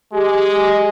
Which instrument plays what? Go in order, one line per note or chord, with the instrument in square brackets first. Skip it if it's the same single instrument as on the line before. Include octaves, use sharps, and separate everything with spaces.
[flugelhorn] G#3 [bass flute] G4